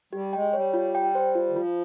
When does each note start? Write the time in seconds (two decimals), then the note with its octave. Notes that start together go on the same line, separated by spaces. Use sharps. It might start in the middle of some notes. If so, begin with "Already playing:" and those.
0.13 G3 G4
0.33 G#3 G5
0.53 G3 C#5
0.74 F4
0.95 G5
1.15 C5
1.35 F4
1.49 D#3
1.55 F3 F4